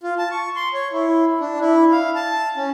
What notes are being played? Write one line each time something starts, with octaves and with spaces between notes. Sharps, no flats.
F4
A5
C#6
C6
C#5
E4
D4
E4
F5
A5
C#4